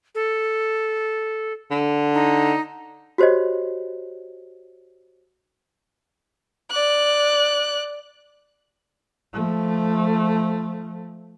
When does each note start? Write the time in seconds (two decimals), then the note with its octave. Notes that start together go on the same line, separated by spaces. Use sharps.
0.15 A4
1.71 D3
2.14 D#4
3.18 F#4 G4 C5 C#5 D#5
6.71 D5 F#6
9.34 F3 A3